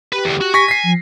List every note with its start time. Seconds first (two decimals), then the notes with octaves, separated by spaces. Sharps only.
0.13 G4 B4
0.25 E2 D3
0.41 F#4
0.54 G#5 C#6 A#6 B6
0.68 B6 C7
0.83 F3